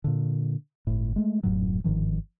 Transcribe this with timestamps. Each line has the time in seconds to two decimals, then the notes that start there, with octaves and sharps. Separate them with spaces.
0.04 A#2 D3
0.87 G1 A2
1.16 G#3 A3
1.43 D#1 F#2 A2 F#3
1.84 G1 G#2 D#3 F3